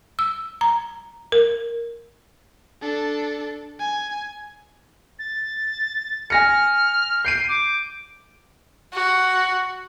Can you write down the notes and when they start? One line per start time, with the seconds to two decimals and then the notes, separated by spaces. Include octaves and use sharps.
0.19 E6
0.61 A#5
1.32 A#4
2.82 D4 A4
3.79 G#5
5.19 A6
6.30 G#5 F6 A#6 C#7
7.25 G6 C7 D7 D#7
7.48 D6
8.93 F#4